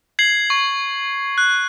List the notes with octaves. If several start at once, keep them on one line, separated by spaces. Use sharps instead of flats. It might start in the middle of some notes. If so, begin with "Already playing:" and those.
G#6 C7 F#7
C#6
F#6